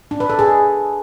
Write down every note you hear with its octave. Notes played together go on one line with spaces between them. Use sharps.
D4
B4
A4
G#4